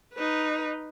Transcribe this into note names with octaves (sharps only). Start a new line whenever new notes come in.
D#4 B4